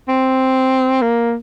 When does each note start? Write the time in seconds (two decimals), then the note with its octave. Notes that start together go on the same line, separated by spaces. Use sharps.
0.08 C4
1.02 A#3